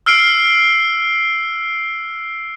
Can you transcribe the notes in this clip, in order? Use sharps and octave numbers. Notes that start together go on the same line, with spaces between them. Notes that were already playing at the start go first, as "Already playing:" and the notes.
E6 F6 C7 D7